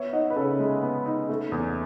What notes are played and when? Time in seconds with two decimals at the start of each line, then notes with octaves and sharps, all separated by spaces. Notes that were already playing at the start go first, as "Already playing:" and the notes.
Already playing: B3 C#5 E5
0.13 D#4 D#5 F#5
0.30 B4
0.36 C#3 A4 C#5
0.59 G#3
0.82 B3
1.06 D#4
1.29 A3
1.52 E2